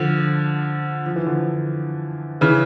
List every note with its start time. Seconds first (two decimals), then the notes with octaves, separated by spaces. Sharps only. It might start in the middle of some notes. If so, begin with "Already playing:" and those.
Already playing: D3 F3
1.06 F3
1.16 E3
1.26 D3 F3
2.41 C#3 E3